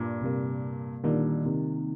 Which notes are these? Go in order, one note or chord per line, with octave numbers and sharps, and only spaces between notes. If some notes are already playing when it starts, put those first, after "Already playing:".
Already playing: G2 A#2
C3 G3 A#3
A#2 D3 D#3 G3 A#3 D#4
C3 D#3